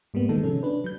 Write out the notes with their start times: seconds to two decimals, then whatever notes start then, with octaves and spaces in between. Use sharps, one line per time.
0.14 G#2 G3 A#3 B3
0.29 D#3 G#3 D#4 A4
0.43 C3 F3 C#4
0.63 D4 B4
0.84 F#3 G6